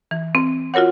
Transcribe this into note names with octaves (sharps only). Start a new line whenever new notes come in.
E3
C4
F4 F#4 A#4 C#5 F#5